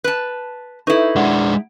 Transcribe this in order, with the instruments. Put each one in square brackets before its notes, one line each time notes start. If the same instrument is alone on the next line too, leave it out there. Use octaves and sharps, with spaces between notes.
[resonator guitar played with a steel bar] B4 A5
[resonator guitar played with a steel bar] D#4 E4 [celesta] A4 B4 C#6
[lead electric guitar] G#3 D4 [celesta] F#5